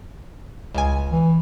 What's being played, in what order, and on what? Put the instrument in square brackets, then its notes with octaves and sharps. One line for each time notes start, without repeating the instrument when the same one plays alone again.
[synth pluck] C#2 G#5
[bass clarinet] E3